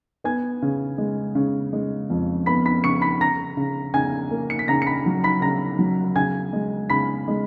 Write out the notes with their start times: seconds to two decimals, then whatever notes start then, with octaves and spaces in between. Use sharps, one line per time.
0.24 B3 G#5 G#6
0.62 C#3
0.98 G#3
1.35 C#3
1.73 G#3
2.10 F2
2.46 B3 B5 B6
2.65 B5 B6
2.84 C#3 C#6 C#7
3.01 B5 B6
3.21 C#3 A#5 A#6
3.57 C#3
3.94 C#3 G#5 G#6
4.31 A#3
4.50 C#7
4.59 B6
4.68 C#3 A#5 A#6
4.82 C#7
4.86 B5 B6
5.06 F#3
5.24 B5 B6
5.42 C#3 A#5 A#6
5.79 F#3
6.16 C#3 G#5 G#6
6.53 G#3
6.90 C#3 B5 B6
7.28 G#3